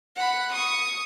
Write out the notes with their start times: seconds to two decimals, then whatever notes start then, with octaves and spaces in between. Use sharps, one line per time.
0.16 F#5 B5
0.53 C#6 D#6